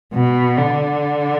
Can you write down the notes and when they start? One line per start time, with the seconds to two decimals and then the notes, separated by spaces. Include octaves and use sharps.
0.13 B2
0.57 D3